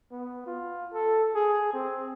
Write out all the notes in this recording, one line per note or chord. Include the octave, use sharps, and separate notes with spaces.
B3
F4
A4
G#4
C4